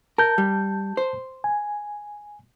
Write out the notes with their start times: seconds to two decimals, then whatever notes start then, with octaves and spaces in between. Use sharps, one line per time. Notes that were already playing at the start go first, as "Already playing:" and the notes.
0.18 A#4 A5 G6
0.38 G3
0.97 C5
1.44 G#5